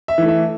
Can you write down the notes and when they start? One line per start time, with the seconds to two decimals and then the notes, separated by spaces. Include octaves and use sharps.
0.08 E5
0.18 E3 A3
0.28 E5